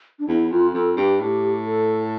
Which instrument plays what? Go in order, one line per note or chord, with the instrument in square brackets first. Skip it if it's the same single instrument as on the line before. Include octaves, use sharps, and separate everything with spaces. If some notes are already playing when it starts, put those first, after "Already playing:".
[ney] D4
[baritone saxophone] E2 [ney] E4
[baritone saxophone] F2 [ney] F4
[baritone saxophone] F2 [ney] A4
[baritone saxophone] G2 [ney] G4
[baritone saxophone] A2 [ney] G4
[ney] A4